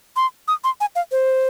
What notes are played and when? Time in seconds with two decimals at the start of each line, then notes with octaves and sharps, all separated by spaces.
0.16 C6
0.48 D#6
0.64 C6
0.81 G#5
0.96 F5
1.12 C5